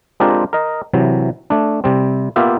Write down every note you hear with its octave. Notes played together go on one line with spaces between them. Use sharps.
G#3 C4 D4 F4 G4 A#4
A#4 D#5
C3 E3 F#3
A3 D4
C3 G3 C4
A#3 B3 F4 G4 E5